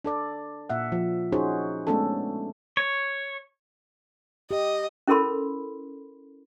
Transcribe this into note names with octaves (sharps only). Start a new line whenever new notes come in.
D4 A4 D5
A#2 E5 F#5
F3
C#4 D#4 F#4 G#4 C5 C#5
G#3 A3 B3 C#4 D4 A4
C#5
G4 D#5
C#4 E4 A4 A#4 B5 C6